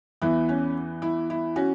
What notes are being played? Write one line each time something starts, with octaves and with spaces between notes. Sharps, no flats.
E2 E3 B3 E4
C#4
E4
E4
C#4 F#4